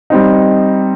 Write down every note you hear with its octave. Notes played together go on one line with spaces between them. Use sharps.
G3 C4 D#4